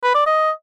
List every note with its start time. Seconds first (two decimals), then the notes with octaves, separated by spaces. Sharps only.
0.03 B4
0.15 D5
0.26 D#5